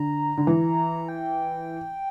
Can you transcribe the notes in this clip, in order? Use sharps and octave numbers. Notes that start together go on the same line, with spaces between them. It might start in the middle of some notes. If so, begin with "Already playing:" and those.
Already playing: D3 A#5
D3
E3
G5